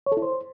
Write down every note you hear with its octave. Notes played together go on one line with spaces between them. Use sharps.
C#5
A4
E4
C5